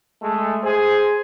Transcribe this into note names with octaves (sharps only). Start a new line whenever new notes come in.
G#3 A3
G#4 C5